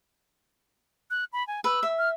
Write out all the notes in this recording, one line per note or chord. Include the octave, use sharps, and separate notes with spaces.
F#6
B5
G#5
B4 E6
E5
F6